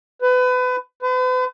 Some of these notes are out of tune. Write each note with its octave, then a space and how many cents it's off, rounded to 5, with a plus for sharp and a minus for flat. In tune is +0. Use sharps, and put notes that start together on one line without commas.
B4 +30
B4 +45